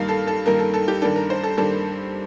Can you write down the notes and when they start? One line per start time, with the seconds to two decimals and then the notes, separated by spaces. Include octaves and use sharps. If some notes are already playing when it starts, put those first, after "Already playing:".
Already playing: G2 D#3 A#3 D#4 F5
0.09 A4
0.27 A4
0.46 G2 D#3 A#3 D#4 A#4
0.59 A4
0.74 A4
0.88 G4
1.02 G2 D#3 A#3 D4 A4
1.16 A#4
1.30 C5
1.43 A4
1.57 G2 D#3 A#3 D4 A4